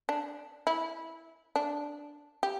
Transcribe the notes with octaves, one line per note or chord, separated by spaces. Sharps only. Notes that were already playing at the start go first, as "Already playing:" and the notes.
D4
E4
D4
G4